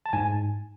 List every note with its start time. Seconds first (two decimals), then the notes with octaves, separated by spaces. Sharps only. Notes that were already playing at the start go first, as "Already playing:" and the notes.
0.06 A5
0.13 G#2 G#5